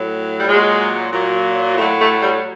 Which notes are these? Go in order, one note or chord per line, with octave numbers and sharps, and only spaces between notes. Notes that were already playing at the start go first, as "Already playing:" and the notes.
Already playing: A2 F#3
G3
A#2 F#3 G#3
A#2 F#3
A2 F#3 A3
A3
G3